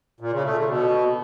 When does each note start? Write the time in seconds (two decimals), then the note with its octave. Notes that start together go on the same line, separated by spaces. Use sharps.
0.20 A#2
0.32 C#3
0.44 A3
0.56 D3
0.68 B2